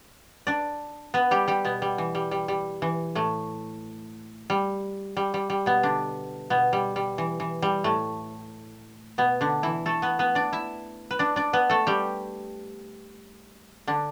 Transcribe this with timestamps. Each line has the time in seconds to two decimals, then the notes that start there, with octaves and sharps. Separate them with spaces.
0.47 D4 D5
1.14 B3 B4
1.31 G3 G4
1.48 G3 G4
1.65 B2 B3
1.82 G3
1.98 E3
2.15 G3
2.31 G3
2.48 G3
2.82 E3
3.15 A2 A3
4.50 G3
5.17 G3
5.34 G3
5.50 G3
5.66 B2 B3
5.83 D3 D4
6.50 B2 B3
6.73 G3
6.96 G3
7.18 E3
7.40 E3
7.62 G3
7.84 A2 A3
9.18 B2 B3
9.41 D3 D4
9.63 E3 E4
9.86 A3 A4
10.02 B3 B4
10.19 B3 B4
10.35 D4 D5
10.53 E4 E5
11.11 B4
11.19 D4 D5
11.36 D4 D5
11.53 B3 B4
11.69 A3 A4
11.87 G3 G4
13.87 D3 D4